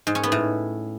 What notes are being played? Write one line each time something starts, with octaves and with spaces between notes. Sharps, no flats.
G#2
C#4
B3
A2